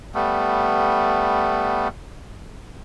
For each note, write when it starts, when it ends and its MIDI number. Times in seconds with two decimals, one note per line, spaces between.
0.14 1.88 55
0.14 1.88 57
0.14 1.88 59